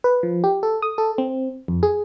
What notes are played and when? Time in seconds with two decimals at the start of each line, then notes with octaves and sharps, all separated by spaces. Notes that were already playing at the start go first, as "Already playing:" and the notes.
0.04 B4
0.23 F3
0.44 G4
0.63 A4
0.82 D#6
0.98 A4
1.18 C4
1.68 F2
1.83 G#4